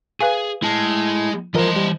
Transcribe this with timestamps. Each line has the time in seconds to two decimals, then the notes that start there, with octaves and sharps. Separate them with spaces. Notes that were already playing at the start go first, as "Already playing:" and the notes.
0.21 G#4 B4 F5 G#5
0.63 G#3 E4 A5
1.55 E3 F3 A#4 C5 D#5 C6
1.76 G3